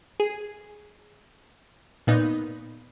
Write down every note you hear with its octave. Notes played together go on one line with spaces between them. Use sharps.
G#4
A#2 B3 D#4